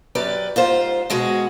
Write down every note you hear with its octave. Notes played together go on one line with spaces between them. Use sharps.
F#2 G4 B4 D5
G#2 F4 C5
B2 G#3 F#4